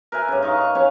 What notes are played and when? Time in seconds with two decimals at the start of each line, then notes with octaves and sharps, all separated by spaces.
0.12 A#4 B4 E5 G#5
0.28 G2 C#3
0.42 D#4 D#5 F5 C#6
0.58 C#6
0.75 C#4 B4 C#5 F5